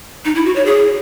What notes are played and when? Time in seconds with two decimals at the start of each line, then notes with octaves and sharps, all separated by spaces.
0.25 D#4
0.35 E4
0.45 F#4
0.56 C#5
0.66 G#4